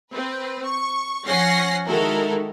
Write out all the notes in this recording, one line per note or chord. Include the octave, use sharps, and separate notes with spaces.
C4 B4
C#6
F3 C#4 F#5 A#6 C7
D#3 G#3 E4 F#4 A4 A#4